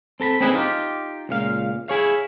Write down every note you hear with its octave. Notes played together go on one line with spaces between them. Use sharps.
C4 A4 A#5 B5
C4 C#4 D#4 E4 G#4 B4
D#4 F4 G4
C#2 A#2 F5
E4 G#4 C#5 F5